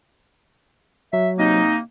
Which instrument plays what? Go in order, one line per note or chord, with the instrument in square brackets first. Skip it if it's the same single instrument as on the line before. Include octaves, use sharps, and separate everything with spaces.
[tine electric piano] F#3 [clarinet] E5
[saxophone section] C3 D#4 [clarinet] A#3